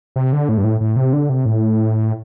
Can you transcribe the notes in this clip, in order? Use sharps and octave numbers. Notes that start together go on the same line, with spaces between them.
C3
D3
A2
G2
A2
A2
C3
D3
C3
A2